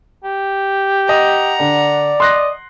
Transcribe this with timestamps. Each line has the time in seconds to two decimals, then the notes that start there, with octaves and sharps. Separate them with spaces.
0.24 G4
1.09 D#5 F#5 A#5
1.60 D3 D5
2.20 D#5 C6 F#6 A#6